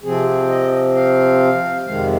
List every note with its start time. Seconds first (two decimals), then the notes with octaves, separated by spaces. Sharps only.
0.03 C3 F3 C4 G#4
0.49 D#5
0.95 F5
1.86 F2 C3 D#3 G#3 F5